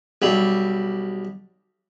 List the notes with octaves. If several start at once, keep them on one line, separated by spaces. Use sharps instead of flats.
B1 G3